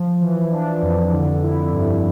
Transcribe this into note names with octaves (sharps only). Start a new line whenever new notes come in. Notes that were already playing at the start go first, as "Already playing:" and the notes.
Already playing: F3
E3
D4
F2
D3
E4
G2